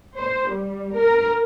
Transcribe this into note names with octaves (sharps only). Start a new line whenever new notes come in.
C5
G3
A#4